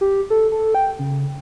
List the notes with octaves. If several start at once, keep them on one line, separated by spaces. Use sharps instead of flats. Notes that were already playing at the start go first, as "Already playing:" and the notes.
G4
A4
A4
G5
C#3